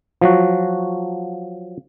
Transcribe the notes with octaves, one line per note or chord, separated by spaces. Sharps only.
F3 F#3 F#4